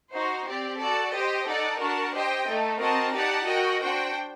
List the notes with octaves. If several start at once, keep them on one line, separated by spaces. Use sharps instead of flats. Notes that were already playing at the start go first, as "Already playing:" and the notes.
D#4 F#4 C5
C4 G4 D5
F#4 A4 D5 A5
G4 C5 D#5 G5
D#4 A4 D5 F#5
D4 F#4 A#4 F#5 A5
G4 C5 D#5 G5
A3 D#4 A4
C4 F#4 A#4 D#5 A5
D#4 G4 D5 F#5 A5
F#4 A#4 D#5 G5
D4 F#4 C5 G5